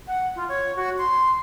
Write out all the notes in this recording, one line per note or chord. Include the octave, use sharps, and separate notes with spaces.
F#5
F4
C#5
F#4
C6